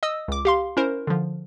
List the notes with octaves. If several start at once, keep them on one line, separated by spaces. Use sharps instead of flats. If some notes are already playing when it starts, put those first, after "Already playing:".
D#5 D#6 E6
C#2 D6
G4 F5 C6
C#4 E4 A#4 C5
D3 F3